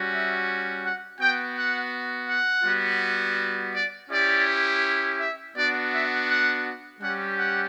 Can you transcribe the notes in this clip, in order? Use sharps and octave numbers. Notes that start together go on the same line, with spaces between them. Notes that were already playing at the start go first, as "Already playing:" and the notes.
Already playing: G3 C#4 F#4
E5
F#5
B3 F#4 G5
F#5
F#5
G3 B3 F#4
D5
C#4 E4 G4 D5
E5
B3 D4 F#4 D5
E5
F#5
G3 C#4 G4 F#5
F#5